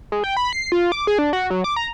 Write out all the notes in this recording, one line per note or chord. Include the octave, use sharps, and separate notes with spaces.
G#3
G5
B5
C7
F4
D6
G#4
D4
F#4
F#3
D6
A#5